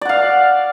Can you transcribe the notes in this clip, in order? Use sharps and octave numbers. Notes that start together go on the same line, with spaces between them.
D5 F5 F#5